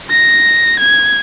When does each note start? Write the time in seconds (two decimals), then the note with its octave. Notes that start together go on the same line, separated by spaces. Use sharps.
0.10 A#6
0.79 G#6